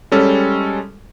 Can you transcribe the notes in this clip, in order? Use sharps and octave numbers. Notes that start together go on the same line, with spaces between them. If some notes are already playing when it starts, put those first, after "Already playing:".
G3 G#3 C#4 A4